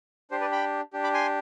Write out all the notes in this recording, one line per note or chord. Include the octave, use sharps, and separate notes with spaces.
D4 G4 C5
B4 D5
G5 B5
D4 G4
B5 D6
G#5 C6